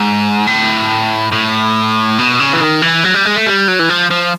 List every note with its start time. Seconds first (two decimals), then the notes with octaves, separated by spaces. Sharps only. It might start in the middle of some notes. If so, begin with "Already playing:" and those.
Already playing: G#2
0.47 A2
1.32 A2
2.18 B2
2.40 C#3
2.53 E3
2.61 D#3
2.82 E3
3.04 F#3
3.14 G3
3.25 G#3
3.36 A3
3.47 G3
3.68 F#3
3.79 E3
3.90 F3
4.11 F3